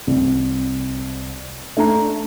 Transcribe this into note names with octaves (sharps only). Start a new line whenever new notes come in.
C2
A3 D4 A4 A#5